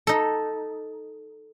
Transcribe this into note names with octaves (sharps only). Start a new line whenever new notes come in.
D#4 A4